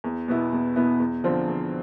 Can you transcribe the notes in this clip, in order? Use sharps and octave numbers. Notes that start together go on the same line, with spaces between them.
E2
B2 B3 E4
E2
B2 B3 E4
E2
D3 F3 C4 F4
E2